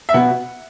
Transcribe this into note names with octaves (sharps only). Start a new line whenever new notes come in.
E5
B2 B3 F#4 F#5